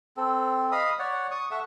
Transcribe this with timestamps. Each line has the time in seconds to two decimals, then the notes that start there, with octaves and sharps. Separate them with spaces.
0.17 C4 A4
0.72 D#5 F5 B5 D#6
0.99 C#5 D5 F#5
1.31 C#6 D#6
1.51 A4 E5 F#5 C#6